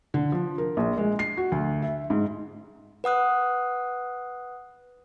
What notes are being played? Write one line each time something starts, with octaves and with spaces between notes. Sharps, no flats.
D3
F3
A#4
A#1
G#3
C7
F#4
D2
E5
G#2
B4 F#5 D#6 F#6